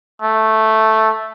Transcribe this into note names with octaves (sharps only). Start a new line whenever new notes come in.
A3